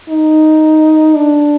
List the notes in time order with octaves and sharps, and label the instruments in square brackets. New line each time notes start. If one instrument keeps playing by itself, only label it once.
[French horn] D#4
D4